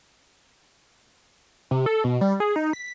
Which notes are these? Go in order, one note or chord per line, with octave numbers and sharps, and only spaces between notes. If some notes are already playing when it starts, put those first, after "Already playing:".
C3
A4
B2
G3
G#4
D#4
B6